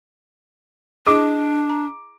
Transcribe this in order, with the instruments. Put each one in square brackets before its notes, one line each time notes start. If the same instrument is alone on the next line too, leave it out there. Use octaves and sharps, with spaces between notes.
[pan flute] D4 [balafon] E4 G#4 [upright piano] D#5 D6
[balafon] A#5